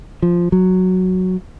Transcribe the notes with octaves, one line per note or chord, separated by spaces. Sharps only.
F3
F#3